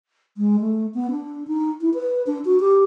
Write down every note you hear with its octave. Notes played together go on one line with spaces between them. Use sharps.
G#3
A3
B3
D4
D#4
E4
B4
D4
F#4
G4